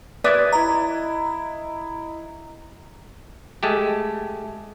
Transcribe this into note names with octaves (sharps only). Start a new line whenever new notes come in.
B4 D5 E5 D#6 G#6
E4 D#5 A#5
G#3 A3 G4